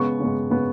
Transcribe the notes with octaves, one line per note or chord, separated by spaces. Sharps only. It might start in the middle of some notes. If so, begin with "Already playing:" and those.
Already playing: C#3 G#3 B3 C#6
C#3 G#3 B3
C#3 G#3 B3